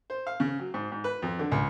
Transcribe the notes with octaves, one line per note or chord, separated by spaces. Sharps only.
C5
F5
C#3
F#3
G#2
G#2
B4
F2
D3
C#2